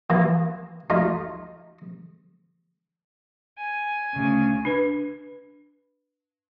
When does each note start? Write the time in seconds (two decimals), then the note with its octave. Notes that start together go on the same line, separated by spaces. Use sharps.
0.10 E3 A#3
0.90 A3 D#4 F4
3.59 G#5
4.14 D2 C#3
4.65 D4 B4